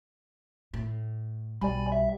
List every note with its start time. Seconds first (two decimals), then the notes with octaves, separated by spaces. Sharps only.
0.74 A2
1.61 B1 G3 D5 G#5 B5
1.92 E5